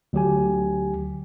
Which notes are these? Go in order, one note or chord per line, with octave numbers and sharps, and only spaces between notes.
D2 F#3 G4 G#5